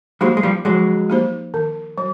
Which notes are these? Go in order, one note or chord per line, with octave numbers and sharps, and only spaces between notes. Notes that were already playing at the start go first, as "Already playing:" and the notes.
F#3 G#3 A#3 D#4 G4 C5
G#3
F3 G3
F3 F#3 G#3
A#3 D#4 G4 C5
D#3
F#3